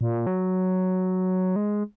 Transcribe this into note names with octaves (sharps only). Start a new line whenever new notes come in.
A#2
F#3
G#3